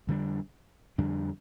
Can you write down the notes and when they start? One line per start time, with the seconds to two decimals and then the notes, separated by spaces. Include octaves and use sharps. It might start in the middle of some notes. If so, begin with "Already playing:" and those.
0.07 F2 D3 G3 D4
0.98 F2 D3 G3 D4